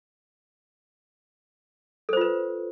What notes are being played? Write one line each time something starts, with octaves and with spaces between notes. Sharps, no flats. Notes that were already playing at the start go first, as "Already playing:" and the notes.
F4 A4 B4 C5